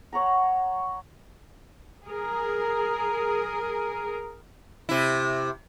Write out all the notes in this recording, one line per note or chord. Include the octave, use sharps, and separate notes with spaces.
C#5 F#5 A#5
G#4 A#4
C3 E4